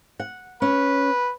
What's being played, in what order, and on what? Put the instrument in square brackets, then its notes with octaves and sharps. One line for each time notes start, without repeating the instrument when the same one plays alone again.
[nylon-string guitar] F#5
[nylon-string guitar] C#4 [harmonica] B4